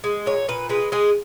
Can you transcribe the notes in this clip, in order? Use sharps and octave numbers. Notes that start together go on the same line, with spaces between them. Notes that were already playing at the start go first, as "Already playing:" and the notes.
G#3
A#2 C#5
A#2 B4
G#3 B4
G#3 G#4